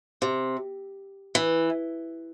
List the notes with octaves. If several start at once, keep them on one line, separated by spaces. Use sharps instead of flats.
C3
E3